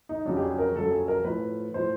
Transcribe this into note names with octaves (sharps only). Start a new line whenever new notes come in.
D#4
F2 C#3 F#3 D4
G4
G#4
A#4
F2 C#3 F#3 A4
G#4
A#4
A2 F3 B4
A2 F3 C5